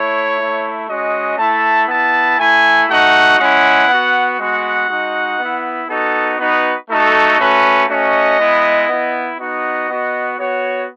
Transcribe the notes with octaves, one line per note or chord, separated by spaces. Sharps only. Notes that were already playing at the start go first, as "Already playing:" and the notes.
Already playing: A3 E4 C#5
A3 E4
G#3 C#4 F#4 D#5
A3 E4 A5
B3 E4 A5
A3 E4 G#5
A3 D#4 F#4 F#5
G#3 C#4 E4 F#5
B3 F#4
G#3 B3 F#4 F#5
G#3 D#4 F#4
B3 E4
B3 D#4 F#4 A4
B3 D#4 F#4 B4
A3 D#4 F#4 A4
A3 C#4 F#4 B4
A3 C#4 F#4 D#5
G#3 B3 E4
B3 E4
B3 D#4 F#4 D#5
B3 F#4
B3 F#4 C#5